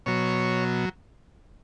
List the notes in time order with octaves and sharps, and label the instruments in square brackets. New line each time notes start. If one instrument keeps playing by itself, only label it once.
[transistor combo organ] B2 F#3 C#5